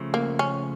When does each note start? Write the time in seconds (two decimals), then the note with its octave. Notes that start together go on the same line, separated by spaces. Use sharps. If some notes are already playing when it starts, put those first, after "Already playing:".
Already playing: C#3 F3 A3
0.14 A#3
0.39 C#4